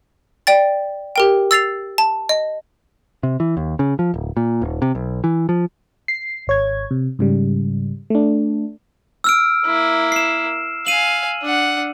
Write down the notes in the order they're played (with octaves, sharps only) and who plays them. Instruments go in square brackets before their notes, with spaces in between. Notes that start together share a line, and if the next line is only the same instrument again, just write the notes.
[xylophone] D5 G5 A6
G4 A#4 G5
E6 A6 C7 F7
A5
D#5
[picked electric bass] C3
E3
D#2
C#3
F3
D1
A#2
D#1
C3
B1
E3
F3
[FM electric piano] C7
G#1 C#5 G#6
C3
G#2 C#3 G3
A3 D4
[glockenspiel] E6 F6 D7
[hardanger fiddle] A#3 E4
[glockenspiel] C7 E7
[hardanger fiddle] F5 G#5 [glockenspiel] D#7 F#7
[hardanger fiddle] D4 F#5